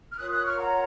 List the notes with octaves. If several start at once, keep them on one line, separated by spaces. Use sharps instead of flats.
F6
F4 A#4 C#5 D#6 F#6
D#6 F#6
C#6 F6
F#5 A#5